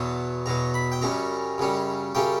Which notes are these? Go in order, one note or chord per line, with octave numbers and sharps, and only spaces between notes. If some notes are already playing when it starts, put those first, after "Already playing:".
Already playing: E2 B2 F#3
E2 B2 F#3 A#5
B5
G5
F#2 C#3 G3 C#4 A#5
F#2 C#3 G3 C#4
F#2 C#3 G3 C#4 G5